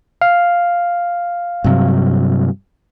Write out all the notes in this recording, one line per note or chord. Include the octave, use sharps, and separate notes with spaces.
F5
G2 C3 F#3